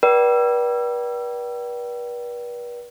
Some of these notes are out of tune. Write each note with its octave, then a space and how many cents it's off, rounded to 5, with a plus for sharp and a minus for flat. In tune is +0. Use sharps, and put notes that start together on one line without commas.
B4 -40 D5 +0 G5 -35